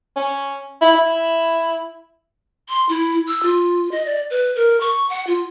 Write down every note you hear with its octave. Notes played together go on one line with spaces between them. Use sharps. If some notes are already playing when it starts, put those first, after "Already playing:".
C#4
E4
E4
C6
E4
E6
F4
D#5
D5
B4
A#4
C#6
F#5
F4